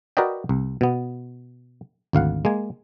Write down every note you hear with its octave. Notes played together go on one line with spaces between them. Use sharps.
F#4 A#4 B4 D5 D#5 G5
C2
B2 B3
G#1 D2 F5 F#5
G#3 A#3 G#5